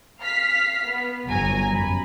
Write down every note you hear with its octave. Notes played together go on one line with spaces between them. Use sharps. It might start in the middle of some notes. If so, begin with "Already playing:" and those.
F5 F6 B6
B3
G1 F#3 G#5 A#5
F#2 B5